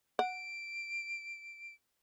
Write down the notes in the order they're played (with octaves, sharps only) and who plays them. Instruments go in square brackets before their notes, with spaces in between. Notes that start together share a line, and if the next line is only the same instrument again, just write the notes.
[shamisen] F#5 [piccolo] D7